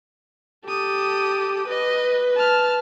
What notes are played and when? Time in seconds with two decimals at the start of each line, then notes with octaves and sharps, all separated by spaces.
0.66 G4 A4 D#6
1.68 B4 D#5
2.36 A5 F6